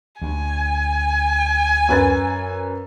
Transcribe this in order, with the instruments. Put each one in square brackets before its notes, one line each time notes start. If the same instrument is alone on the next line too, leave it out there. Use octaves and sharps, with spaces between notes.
[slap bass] D2 [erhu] G#5
[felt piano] F#2 B4 A6